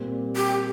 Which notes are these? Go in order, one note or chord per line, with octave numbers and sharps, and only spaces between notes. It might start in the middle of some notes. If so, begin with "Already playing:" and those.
Already playing: A#2 G3 C4
G4